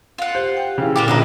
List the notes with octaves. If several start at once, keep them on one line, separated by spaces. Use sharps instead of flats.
F4 F#5
G4 C5
G5
C#3 E3
A#2 D3 A#3 F4 G4
A#1 C#3 D4 A#4 B4 D#5